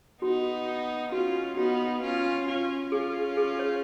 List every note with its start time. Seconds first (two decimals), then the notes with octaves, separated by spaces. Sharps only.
0.22 B3 D#4 F#4
1.12 C#4 F4 F#4
1.57 B3 D#4 F#4
2.02 C#4 F4
2.47 C#4 F4
2.92 C#4 F4 G#4
3.37 G#4
3.59 C#5